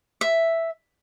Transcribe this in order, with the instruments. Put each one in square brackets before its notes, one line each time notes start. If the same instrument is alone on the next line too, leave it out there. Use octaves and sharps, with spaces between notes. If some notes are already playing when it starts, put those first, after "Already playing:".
[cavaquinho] E5